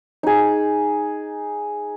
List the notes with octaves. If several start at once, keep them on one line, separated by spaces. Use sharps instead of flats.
D#4 G#4